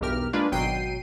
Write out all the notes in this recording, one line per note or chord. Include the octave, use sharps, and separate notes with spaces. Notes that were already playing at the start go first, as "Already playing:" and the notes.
B1 E2 G2 G4 A#4 F6
G#3 A#3 D4 F4 B4 D5
G#1 B2 F#3 G5 C7 D#7